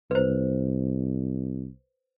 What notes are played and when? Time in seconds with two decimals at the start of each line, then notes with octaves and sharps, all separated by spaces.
0.11 C2 B4 C5